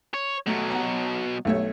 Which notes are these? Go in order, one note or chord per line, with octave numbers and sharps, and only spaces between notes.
C#5
B2 F#3 A3
F#5 A#5
B1 A3 C#5